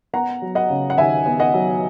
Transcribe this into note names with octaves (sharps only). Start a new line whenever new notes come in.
B3 F#5 A#5
F#3
D#5 F#5
C#3
F#5
D#2 E5 G#5
B3
D#5 F#5
F#3